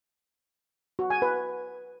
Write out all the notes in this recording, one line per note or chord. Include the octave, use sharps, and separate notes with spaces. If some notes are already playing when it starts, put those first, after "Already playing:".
F#4
G#5
B4